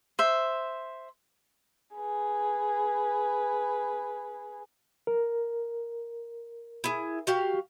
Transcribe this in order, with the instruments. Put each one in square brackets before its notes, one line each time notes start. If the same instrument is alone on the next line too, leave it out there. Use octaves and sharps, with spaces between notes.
[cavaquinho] C5 E5
[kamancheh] G#4 B4
[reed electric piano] A#4
[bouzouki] E4 G#4
F#4 G4 F5